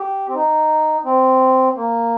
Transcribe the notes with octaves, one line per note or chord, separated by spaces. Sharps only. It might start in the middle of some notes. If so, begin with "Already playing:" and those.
Already playing: G4
C4
D#4
C4
A#3